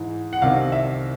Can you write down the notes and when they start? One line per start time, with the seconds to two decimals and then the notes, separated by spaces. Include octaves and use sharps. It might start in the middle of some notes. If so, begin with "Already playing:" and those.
Already playing: G#2 E3
0.33 F#5
0.42 C2 C3 D#3 F5
0.72 E5